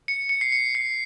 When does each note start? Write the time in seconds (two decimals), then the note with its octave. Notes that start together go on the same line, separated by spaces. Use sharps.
0.08 C#7
0.29 C#7
0.41 C7
0.52 C#7
0.75 C7